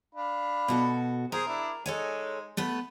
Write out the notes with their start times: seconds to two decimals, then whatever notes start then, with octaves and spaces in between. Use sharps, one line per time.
0.15 D4 F5 B5
0.68 B2 F#4 A4
1.32 G#4 A#4 C5
1.47 D4 E4 D5
1.86 G#3 D#4 A4 C#5 G#5
2.57 A3 B3 B4